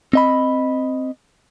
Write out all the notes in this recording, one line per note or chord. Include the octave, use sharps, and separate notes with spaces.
C4 D#5 B5